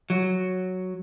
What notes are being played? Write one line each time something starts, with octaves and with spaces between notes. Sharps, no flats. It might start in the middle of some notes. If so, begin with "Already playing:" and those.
F#3